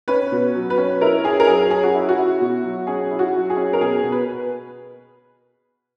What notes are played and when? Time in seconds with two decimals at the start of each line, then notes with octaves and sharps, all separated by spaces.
0.08 C#4 B4
0.32 B2
0.55 F#3
0.70 B4
0.77 C#4
1.01 E4 A#4
1.24 C#4 G#4
1.40 A#4
1.47 F#3 G#4
1.71 C#4 G#4
1.83 F#4
1.95 E4
2.09 F#4
2.17 E4
2.41 B2
2.64 F#3
2.87 C#4 G#4
3.11 E4
3.19 F#4
3.34 F#3
3.50 G#4
3.57 C#4
3.73 A#4
3.81 B2 G#4
4.03 B2
4.12 B4